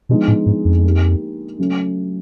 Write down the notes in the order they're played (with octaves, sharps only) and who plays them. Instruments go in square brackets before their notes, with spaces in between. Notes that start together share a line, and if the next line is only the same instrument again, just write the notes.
[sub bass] B2 [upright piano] D3 F3 G#3 B3 D#4
[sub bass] A2
G#2
F2
[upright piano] A#3 D#4 G4
C#3 F#3 A3 C#4